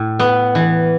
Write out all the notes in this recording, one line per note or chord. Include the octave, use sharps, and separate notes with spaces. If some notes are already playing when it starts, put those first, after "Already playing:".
Already playing: A2
B3
E3